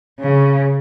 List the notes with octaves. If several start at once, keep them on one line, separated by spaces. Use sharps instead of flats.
C#3